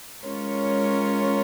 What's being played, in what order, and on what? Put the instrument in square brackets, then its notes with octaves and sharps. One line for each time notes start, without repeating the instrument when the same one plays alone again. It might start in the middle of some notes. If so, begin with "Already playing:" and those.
[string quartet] G#3 C#4 F4 A#4 C#5